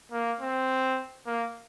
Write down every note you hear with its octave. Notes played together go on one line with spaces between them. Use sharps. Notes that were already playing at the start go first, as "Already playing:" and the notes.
A#3
C4
A#3